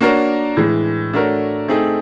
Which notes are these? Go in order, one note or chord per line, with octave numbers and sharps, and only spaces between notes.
A#3 D4 F#4 A#4 C#5
A2 E3 G#3
A3 D4 F#4 A#4 C#5
A3 C4 D#4 G#4